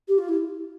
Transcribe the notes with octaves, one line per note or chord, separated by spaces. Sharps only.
G4
F4
E4